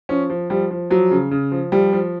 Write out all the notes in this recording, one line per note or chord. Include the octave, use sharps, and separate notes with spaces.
F3 C#4
F3
F3 G3
F3
F3 F#3
C#3
C#3
F3
F3 G3
F3